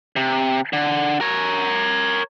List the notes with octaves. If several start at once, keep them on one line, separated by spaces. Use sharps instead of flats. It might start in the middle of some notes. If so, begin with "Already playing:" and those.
C3
D3
A#4 C#5